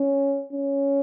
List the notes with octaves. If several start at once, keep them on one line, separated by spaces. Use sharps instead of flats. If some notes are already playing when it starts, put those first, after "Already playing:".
Already playing: C#4
C#4